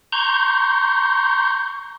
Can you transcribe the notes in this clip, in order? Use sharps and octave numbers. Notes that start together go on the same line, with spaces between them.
A#5 C6 C#6 G6